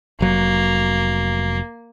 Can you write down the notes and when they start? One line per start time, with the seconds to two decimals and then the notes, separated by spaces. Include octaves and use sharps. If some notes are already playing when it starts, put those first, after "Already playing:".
0.21 F1 F#3 A#3